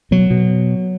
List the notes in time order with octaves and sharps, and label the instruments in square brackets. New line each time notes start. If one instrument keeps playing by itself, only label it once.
[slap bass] B2 F#3
B2